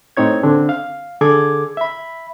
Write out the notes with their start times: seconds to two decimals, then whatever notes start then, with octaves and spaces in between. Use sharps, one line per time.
0.17 A2 C4 D#4 C#5 G#6
0.43 D3 C4 D4
0.69 F5
1.21 D3 G#4 A4 D6 G#6
1.77 E5 B5